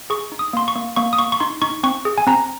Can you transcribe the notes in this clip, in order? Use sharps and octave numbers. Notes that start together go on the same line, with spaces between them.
G#4 C#6
D#4
D#6
A#3 C6
C#6
A#3
A#3 C#6
D#6
A#3 C#6
C#6
D#4 C6
D#4 C#6
C4 C#6
G#4
G#5
C4 A#5